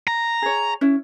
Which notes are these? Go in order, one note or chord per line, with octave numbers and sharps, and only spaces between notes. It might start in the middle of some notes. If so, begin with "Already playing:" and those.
A#5
G#4 C#5
C#4 E4